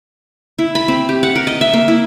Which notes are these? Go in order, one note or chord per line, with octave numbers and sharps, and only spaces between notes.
E4
B5
C4
G4
F#5
A#4
D#5
E5
A#3
E4